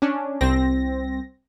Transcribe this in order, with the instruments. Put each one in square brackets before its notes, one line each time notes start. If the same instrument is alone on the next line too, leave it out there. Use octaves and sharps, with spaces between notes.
[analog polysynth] C#4 D4
C2 C4 A#6